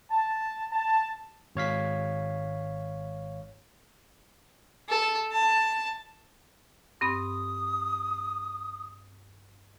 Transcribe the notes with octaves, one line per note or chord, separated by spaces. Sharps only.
A5
A5
G#1 C#5 F5 B6
A4
A5
G2 C4 B5 D#6